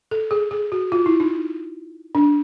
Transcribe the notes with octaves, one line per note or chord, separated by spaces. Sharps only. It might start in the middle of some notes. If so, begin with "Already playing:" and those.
A4
G#4
G#4
F#4
F4
E4
D#4
D4